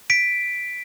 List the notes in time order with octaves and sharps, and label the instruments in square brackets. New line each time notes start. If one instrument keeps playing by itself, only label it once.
[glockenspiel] B6 D7